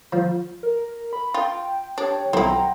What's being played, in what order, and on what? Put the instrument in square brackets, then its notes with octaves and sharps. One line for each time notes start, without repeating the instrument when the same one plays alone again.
[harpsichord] F3
[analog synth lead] A#4
B5
[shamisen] F4 [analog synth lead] G5
[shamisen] D4 [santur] G4 [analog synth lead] C#5
[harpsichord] B1 [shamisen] C4 E4 [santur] F#5 G5 [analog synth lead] A#5